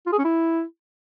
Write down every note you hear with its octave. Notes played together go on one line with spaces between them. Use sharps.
F4
G#4
C#4
E4